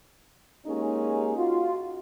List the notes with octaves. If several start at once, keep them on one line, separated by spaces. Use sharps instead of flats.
G#3 A#3 C#4 D#4 G4 G#4
F4 F#4